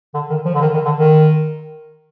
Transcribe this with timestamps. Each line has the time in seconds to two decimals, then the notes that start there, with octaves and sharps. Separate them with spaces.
0.14 D3
0.30 D#3
0.45 F3
0.55 D3
0.61 D#3
0.74 D#3
0.85 D3
0.97 D#3